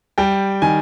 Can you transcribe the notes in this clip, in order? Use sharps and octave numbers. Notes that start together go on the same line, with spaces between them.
G3 G5
D#3 G#5